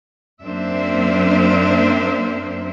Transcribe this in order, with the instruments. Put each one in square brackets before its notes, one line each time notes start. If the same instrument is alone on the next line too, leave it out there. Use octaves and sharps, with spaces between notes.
[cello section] F#2 A#3 C4 D4 C5 E5